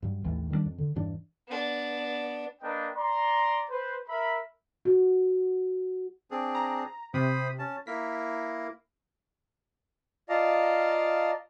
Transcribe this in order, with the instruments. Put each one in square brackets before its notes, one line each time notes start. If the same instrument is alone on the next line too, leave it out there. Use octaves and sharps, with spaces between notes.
[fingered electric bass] G2 F#3
A1 D#2 E3 A3
D#3 G3 A3 D4
F2
D3
E1 G2 E3 D4
[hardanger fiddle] B3 D4
[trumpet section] A#3 D4 A#4 B4 D#5 G5
D5 A#5 C6
B4 C5
A#4 E5 B5
[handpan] F#4
[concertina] C4 D4 G#4
[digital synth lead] A#5
[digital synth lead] C3 [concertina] C5 B5 D#6
[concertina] C#4 A5
[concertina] A#3 E4 A#4 [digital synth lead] B6
[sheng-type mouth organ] F4 D5 D#5 F5 A5 A#5